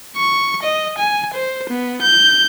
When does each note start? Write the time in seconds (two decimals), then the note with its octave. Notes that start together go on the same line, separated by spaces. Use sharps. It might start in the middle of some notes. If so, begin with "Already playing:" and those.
0.16 C#6
0.63 D#5
0.98 G#5
1.34 C5
1.69 B3
2.02 G6